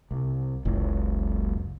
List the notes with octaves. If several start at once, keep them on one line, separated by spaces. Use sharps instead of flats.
C2
F#1 C#2